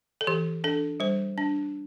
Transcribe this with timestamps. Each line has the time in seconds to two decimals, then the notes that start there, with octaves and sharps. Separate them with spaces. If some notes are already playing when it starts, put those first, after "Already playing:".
0.21 A4
0.27 E3 G4
0.64 D4 A4
1.00 G3 C5
1.38 D4